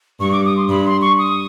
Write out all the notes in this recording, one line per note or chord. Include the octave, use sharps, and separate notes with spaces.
G2 C#6
D6
D#6
C6
G2 B5
C6
C#6
D#6